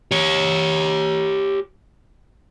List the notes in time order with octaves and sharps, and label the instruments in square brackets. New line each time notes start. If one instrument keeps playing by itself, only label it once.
[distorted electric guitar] G4 C#5